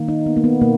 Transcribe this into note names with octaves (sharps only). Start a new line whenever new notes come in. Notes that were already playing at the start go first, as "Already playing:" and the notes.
Already playing: D#3 A#3
D#4
B3
A#3
B3
B2 A#3